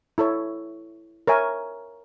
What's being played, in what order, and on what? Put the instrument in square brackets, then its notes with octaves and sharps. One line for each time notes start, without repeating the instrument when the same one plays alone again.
[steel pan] E4 A4 C#5
A#4 C#5 E5 G#5